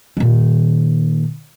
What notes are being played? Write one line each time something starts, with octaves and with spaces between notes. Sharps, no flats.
A#2 D#3